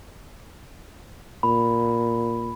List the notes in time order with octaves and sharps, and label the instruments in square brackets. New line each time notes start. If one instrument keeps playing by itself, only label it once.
[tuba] A#2 [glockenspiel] B5